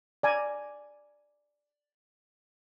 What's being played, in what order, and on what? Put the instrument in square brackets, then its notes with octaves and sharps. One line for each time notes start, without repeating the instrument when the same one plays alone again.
[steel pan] D5 G#5 A#5